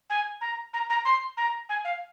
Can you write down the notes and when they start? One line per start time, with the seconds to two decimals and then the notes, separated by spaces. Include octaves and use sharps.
0.10 G#5
0.41 A#5
0.74 A#5
0.90 A#5
1.05 C6
1.37 A#5
1.69 G#5
1.85 F5